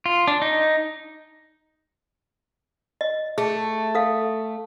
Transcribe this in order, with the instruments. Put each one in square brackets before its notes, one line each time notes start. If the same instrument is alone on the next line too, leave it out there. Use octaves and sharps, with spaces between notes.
[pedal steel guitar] F4
D4
D#4
[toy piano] D#5
[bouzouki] A3 [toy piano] G#4
[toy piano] A4 F5